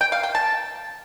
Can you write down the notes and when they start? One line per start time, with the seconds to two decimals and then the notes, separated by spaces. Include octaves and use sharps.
0.01 G5
0.12 F5
0.23 G5
0.35 A5